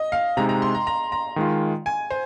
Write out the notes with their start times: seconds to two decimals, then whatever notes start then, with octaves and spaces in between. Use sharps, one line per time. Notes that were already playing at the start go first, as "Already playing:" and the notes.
Already playing: D#5
0.12 F5
0.37 C3 G#3 D#4 A#5
0.49 A#5
0.62 C6
0.75 A#5
0.87 A#5
1.12 A#5
1.36 D#3 G#3 F4
1.86 G#5
2.10 C5